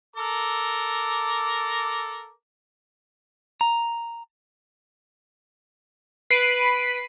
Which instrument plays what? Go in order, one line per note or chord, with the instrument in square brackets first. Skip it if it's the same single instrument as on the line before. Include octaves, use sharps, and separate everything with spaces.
[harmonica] A4 A#4 D6
[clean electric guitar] A#5
[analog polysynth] B4 B5 [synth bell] C7 D7 D#7